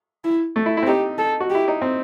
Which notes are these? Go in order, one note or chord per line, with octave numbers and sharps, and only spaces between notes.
E4
A3
E4
E4
C4
D#4 G4
A4
F#4
E4 G4
D#4
C4